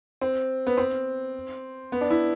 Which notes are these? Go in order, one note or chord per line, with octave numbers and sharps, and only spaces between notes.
C4
B3
C4
B3
D4
E4